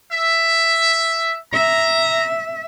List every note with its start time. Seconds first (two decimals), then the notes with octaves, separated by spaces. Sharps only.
0.12 E5
1.54 E5 A#5